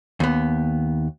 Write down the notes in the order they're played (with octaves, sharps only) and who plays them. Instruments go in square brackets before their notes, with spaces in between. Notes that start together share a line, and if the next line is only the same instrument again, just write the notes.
[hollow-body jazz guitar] D#2 B3